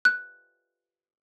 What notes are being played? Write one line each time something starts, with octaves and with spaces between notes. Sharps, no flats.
F#6